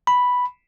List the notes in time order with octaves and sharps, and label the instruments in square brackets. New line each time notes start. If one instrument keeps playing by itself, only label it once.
[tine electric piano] B5